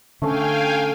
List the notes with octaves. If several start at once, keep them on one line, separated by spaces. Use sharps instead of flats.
D3 A3 C#4 F5 G5 G#5